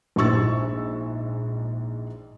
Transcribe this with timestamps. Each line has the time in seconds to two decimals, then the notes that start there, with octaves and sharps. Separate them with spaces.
0.16 A#1 G#2 E4 C#6 E6 A6